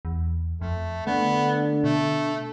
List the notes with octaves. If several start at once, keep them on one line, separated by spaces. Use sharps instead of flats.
E2
F2 A3
D3 A3 B3 D4
B2 A3